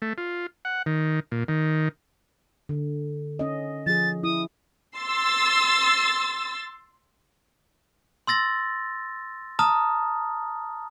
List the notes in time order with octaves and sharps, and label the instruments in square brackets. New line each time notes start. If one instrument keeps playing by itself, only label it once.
[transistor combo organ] A3
F4
F#5
D#3
A#2
D#3
[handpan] D3
C#4 D#5
[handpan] F3 G#4 [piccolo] A6
[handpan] E4 [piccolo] D#6
[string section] C6 E6 A6
[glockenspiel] C6 E6 A6 A#6
A5 A#5 D#6 F6